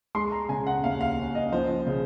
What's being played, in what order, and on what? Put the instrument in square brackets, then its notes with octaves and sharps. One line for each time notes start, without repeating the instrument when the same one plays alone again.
[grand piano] G#3 C6
A#5
C#3 G#5
F#5
D#2 F5
F5
C#4
D#5
F3 C5
C#3